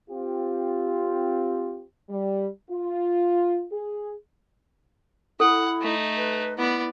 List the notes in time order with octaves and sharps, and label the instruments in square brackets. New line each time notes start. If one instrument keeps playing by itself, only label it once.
[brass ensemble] C4 F4 G4
[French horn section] G3
F4
G#4
[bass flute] E4 [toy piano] A4 [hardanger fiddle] F#5
[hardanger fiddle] A3 D#4
[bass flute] B4
[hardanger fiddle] B3 D5 [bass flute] E4